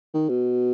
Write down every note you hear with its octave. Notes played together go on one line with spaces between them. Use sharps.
D#3
B2